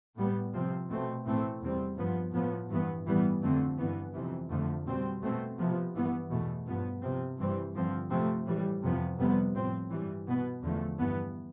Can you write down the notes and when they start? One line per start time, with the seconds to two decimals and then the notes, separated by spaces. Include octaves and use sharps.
0.17 A2 G3 B3
0.54 C3 F3 C4
0.89 B2 A3 C4
1.25 A2 E3 A3 C4
1.62 E2 C3 G3 C4
1.97 G2 F3 B3
2.33 A2 F3 B3
2.70 G2 E3 B3
3.06 A2 E3 G3 B3
3.41 F2 D3 A3 C4
3.78 G2 E3 B3
4.13 F2 C3 E3
4.50 F2 D3 F3 A3
4.86 B2 G3 C4
5.22 B2 A3 C4
5.59 C3 F3 B3
5.95 G2 E3 B3
6.30 E2 B2 A3
6.66 G2 F3 B3
7.02 C3 F3 C4
7.38 G2 E3 G3 C4
7.74 G2 D3 F3 C4
8.11 C3 F3 A3 C4
8.46 A2 E3 G3
8.83 F2 C3 F3 B3
9.19 F2 C3 G3 B3
9.54 A2 F3 C4
9.91 G2 E3 G3
10.26 B2 B3
10.62 E2 D3 F3 A3
10.99 G2 E3 B3